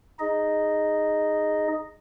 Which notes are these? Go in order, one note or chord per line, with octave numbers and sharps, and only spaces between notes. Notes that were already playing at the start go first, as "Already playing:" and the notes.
D#4 G#4 D#5